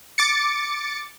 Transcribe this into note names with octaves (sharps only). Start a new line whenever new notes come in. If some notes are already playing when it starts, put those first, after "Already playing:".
D6 A6 C#7